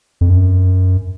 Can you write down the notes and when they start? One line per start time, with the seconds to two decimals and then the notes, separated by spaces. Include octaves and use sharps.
0.21 F2
0.30 F#2